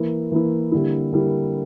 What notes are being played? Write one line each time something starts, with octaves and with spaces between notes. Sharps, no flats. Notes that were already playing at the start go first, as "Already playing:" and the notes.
Already playing: E3 A#3 E4
E3 A#3 E4
D3 G3 A#3 E4
D3 G3 A#3 E4